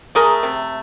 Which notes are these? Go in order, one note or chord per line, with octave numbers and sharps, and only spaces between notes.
A3 G#4 A#4
C3